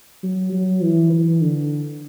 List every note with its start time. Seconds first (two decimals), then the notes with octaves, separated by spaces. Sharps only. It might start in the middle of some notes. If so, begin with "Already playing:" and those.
0.23 F#3
0.53 F#3
0.82 E3
1.12 E3
1.41 D3